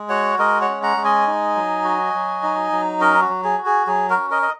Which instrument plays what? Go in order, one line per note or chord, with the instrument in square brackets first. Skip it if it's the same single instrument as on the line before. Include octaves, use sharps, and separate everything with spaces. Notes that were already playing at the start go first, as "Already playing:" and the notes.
Already playing: [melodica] G#3
F#4 C#5 F#5
G#3 A#4 D#5
C#5 F#5
C#4
F#5 A#5
G#3
D#5 G#5
D#4
F#3
F#4
F#3
D#4
F#3
C#4 A#4 D#5
F#4
F#3
G#4
F#4
G#4
F#3 G#4
F#4 A#4
C#4
A#4 D#5
D#5